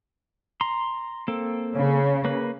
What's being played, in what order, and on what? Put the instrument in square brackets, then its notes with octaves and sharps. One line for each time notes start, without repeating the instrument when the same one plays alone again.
[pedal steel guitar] A#5 C6
A#3 C4 A4
[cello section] C#3
[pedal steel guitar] A#3 B4